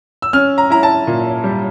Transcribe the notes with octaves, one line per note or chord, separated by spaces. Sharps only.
E6
C#4 F6
A#5
E4 A#5
A5
A#2
G3